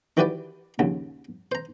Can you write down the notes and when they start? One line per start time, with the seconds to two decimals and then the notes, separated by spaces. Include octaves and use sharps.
0.17 D#3 E3 F#4 G4 B4 D5
0.79 A#1 D#2 C#3
1.52 C5 A#5